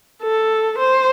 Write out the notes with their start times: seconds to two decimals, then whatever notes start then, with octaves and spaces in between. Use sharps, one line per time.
0.22 A4
0.78 C5